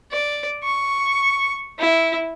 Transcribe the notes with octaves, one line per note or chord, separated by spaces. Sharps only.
D5
C#6
E4